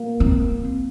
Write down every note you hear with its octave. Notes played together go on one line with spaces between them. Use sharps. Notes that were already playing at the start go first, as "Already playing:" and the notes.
Already playing: A#3
C4